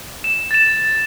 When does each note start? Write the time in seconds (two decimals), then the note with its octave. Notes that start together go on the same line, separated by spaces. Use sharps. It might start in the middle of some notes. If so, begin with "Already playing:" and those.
0.24 E7
0.51 A6 E7